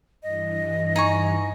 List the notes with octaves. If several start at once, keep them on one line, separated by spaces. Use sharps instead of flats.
G2 E3 D#5
D#4 G#5 C#6